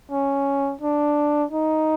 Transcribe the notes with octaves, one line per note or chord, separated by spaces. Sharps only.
C#4
D4
D#4